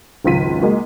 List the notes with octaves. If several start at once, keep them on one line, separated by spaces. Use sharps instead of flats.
G#1 C#2 F#3 F4 B6 D#7
G#3 A#3 F#4